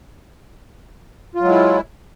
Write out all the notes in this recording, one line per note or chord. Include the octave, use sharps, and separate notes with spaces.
F#3 G#3 E4 F4